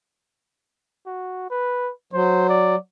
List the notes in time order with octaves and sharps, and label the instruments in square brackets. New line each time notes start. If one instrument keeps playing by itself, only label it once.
[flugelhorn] F#4
B4
[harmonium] F#3 [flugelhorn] C5
[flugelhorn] D5